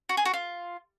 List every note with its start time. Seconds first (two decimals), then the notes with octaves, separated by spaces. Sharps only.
0.09 F#4
0.17 G#4
0.25 F#4
0.33 F4